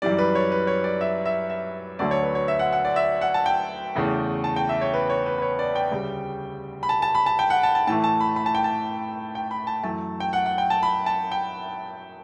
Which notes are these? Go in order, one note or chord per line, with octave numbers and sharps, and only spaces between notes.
F#2 E3 G3 D5
B4
C#5
B4
C#5
D5
E5
E5
E5
D2 D3 F#3 A3 D5
C#5
B4
C#5
E5
F#5
F#5
D5
E5
F#5
A5
G5
E2 C#3 E3 A3
A5
G5
E5
C#5
B4
C#5
B4
B4
C#5
D5
G5
D2 C#3 G3
B5
A5
A5
B5
A5
G5
F#5
A5
A5
A2 E3 A3 A5
A5
B5
B5
A5
G5
A5
G5
B5
A5
F#2 E3 A3 A5
G5
F#5
F#5
G5
A5
B5
A5
G5